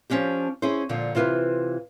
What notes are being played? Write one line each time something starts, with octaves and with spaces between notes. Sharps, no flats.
F3 A#3 C#4 D4 G4
C#4 E4 G#4 C5
A#2 D3 F3
C3 E3 F4 A#4 B4 E5